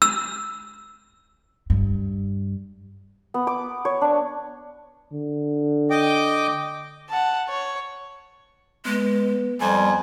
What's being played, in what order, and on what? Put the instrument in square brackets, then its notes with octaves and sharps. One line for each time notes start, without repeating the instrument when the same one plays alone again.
[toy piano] E6
[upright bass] G2
[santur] B3
D6
C#5
D4
[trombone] D3
[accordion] D#5 G5 D6
[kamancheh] F#5 A5
C#5
[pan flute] G#3 [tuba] B3
[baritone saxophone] F2 [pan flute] G3 [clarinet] G#5